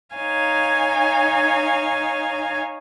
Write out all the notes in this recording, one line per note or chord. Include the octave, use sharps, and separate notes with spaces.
D#4 C#5 F5 G#5